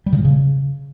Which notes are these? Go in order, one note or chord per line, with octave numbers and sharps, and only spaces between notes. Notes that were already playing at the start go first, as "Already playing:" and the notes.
G3
C#3
A#2
C#3